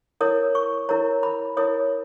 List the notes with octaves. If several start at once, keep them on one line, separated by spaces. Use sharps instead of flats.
E4 A#4 C#5 D#6
C#6
E4 A#4 C#5 A#5
B5
E4 A#4 C#5 D#6